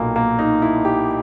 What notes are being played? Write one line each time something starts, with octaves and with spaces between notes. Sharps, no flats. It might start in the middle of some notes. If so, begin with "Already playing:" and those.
Already playing: B1 A#2 A#3
A#3
D#4
E4
G4